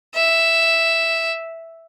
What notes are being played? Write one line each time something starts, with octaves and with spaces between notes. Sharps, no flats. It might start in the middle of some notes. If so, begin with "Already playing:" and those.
E5